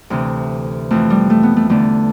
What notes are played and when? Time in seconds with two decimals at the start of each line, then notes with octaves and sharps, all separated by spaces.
0.10 D2 C3 E3
0.90 F2 E3 A3
1.10 G3
1.30 A3
1.43 B3
1.56 A3
1.69 E2 D3 A3